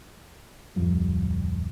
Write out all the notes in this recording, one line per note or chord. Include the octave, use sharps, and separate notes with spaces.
D1 F2 F3 G3